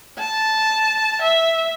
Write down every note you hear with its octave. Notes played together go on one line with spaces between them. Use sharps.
A5
E5